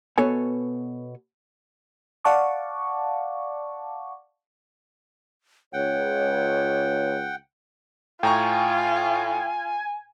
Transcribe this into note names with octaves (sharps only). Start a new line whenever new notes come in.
B2 B3 A4 C#5 G#5
D5 F5 F#5 A5 C#6 D6
C#2 C#5 F#5 G5
A2 F4 G5 G#5 A#5 C#6